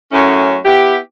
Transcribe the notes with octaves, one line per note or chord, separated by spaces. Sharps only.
F#2 A2 C#4
B3 E4 G4